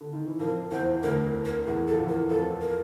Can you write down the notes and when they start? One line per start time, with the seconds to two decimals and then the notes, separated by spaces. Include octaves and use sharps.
0.01 D3
0.13 D#3
0.26 E3
0.39 F2 F3 A#4
0.71 E2 E3 C5
1.03 D2 D3 A#4
1.45 A#4
1.67 E2 E3 G#4
1.88 A4
1.92 F3
1.98 E2 E3
2.09 A#4
2.29 F2 F3 A4
2.62 A#4